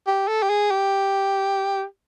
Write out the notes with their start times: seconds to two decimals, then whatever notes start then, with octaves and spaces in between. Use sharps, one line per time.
0.07 G4
0.28 A4
0.43 G4
0.50 G#4
0.71 G4